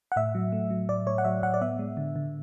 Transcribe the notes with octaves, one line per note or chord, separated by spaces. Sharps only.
F#5
A2 E5
F#3
A3
F#3
A2 D5
A2 C#5
F#5
F#3 E5
A2 F#5
D5
B3 E5
G#3
D3
D3